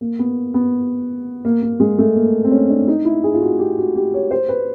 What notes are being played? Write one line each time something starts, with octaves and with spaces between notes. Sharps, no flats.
A#3
B3
B3
A#3
A#3
G#3
A3
A#3
C4
C#4
D4
D#4
E4
G#4
F4
F#4
G4
F#4
G4
C#5
C5
B4